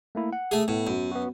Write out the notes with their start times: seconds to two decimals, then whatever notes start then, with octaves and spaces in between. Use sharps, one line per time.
0.15 A3 A#3 E4
0.33 F#5
0.51 A3 G#4
0.68 A2 B3
0.87 F#2
1.11 B3 F#4